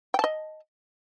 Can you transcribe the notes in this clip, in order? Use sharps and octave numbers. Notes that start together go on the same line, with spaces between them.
D#5 G5 A5